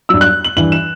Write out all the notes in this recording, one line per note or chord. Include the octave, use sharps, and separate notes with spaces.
G2 F#3 E6
F#6
F#7
G2 E3 F#7
E7